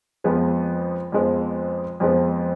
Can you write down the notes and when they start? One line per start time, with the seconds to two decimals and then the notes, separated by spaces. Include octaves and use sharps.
0.24 F2 F3 G#3 B3
1.12 F2 F3 G#3 B3
2.00 F2 F3 G#3 B3